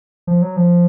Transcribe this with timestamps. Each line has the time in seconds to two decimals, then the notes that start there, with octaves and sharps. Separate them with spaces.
0.27 F3
0.42 F#3
0.57 F3